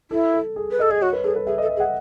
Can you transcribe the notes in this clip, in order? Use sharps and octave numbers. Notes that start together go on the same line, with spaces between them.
E4 A4
A4
G#4
B4
A4 D#5
G#4 D#5
F#4 C#5
B4
G#4 A4
B4
G#4 E5
A4 D#5
E5
G#4
F#5